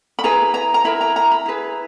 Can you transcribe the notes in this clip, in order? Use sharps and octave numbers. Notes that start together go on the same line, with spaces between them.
B5
E4 G#4 B4 A#5
A#5
A#5
E4 A#4 B5
A#5
A#5
B5
E4 G#4 B4